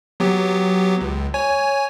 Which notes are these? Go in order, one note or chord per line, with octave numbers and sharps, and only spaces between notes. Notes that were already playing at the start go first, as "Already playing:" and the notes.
F#3 B3 G4
C#2
C#5 G#5